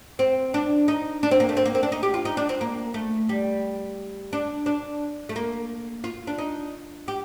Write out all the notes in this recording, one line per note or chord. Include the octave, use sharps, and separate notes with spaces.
C4
D4
D#4
D4
C4
A#3
A3
C4
A#3
C4
D4
D#4
G4
F4
D#4
D4
C4
A#3
A3
G3
D4
D4
A3
A#3
F4
D4
D#4
G4